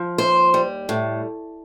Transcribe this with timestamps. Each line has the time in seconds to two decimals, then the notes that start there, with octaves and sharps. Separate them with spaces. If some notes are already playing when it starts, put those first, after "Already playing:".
Already playing: F3
0.18 D#2 C5
0.54 G3
0.89 A2